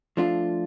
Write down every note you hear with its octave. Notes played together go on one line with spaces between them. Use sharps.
F3 A3 D4 F4